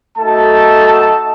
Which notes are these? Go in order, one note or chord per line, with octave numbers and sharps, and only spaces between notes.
A3 D#4 F#4 A4 A5